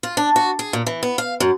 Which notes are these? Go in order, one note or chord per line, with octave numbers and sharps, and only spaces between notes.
F4
D4
F#4
G#4
A#2
E3
B3
F5
F#2